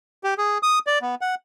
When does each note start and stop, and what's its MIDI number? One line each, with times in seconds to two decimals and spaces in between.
0.24 0.34 67
0.38 0.58 68
0.63 0.79 87
0.87 0.99 74
1.02 1.15 59
1.21 1.35 78